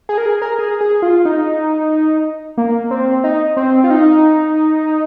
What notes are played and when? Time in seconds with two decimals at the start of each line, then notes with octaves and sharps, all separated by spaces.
0.09 G#4
0.18 A#4
0.26 G#4
0.42 A#4
0.59 G#4
0.81 G#4
1.02 F4
1.25 D#4
2.58 A#3
2.91 C4
3.24 D#4
3.57 C4
3.84 F4
3.90 D#4